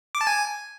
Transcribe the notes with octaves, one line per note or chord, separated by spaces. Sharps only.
D6
A5
G#5